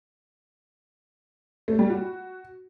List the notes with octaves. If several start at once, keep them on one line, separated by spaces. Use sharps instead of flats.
A3
G3
F#4